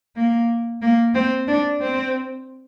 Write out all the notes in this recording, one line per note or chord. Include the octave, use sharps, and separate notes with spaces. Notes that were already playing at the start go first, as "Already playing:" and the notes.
A#3
A#3
C4
D4
C4